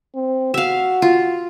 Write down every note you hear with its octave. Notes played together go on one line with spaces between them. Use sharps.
C4
F#4 E5 F5
F4